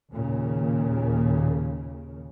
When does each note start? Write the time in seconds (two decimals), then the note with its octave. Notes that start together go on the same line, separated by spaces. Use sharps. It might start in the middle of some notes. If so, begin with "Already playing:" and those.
0.11 D#2 A#2 C#3